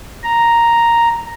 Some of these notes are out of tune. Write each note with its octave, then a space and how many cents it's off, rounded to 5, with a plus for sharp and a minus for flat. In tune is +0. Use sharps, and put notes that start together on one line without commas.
A#5 +0